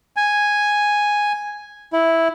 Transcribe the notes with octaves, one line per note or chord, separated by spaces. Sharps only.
G#5
E4